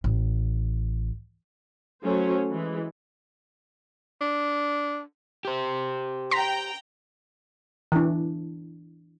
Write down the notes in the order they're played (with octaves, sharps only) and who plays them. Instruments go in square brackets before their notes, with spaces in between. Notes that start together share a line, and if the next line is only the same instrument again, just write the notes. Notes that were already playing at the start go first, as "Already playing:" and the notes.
[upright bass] A1
[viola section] F#3 A3 C#4 C5
E3 G#3
[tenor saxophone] D4
[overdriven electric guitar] G4 C5
[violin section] G5 A#5 [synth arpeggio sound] C6 A#6 B6
[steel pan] E3 D4